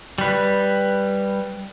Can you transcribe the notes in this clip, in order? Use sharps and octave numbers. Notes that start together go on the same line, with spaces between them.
G3 B4